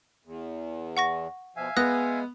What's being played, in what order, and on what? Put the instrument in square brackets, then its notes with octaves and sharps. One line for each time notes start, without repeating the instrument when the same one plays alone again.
[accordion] E2
[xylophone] F#5 C#6 A#6
[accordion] B2 F3 [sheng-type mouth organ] E5 F5 G#5
[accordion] G#3 [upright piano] B3 [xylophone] D#6 F#6 A#6